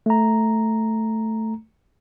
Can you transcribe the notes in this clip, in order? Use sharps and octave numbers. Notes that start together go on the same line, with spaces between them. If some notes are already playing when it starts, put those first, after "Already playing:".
A3 A#5